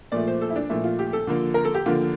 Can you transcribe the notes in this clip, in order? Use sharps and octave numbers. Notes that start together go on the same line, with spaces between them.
A#2 F3 A3 D5
C5
A4
E4
D4
A#2 F3 A3 E4
F4
G4
A4
D3 F3 A#3
A#4
A4
G4
D3 F3 A#3 F4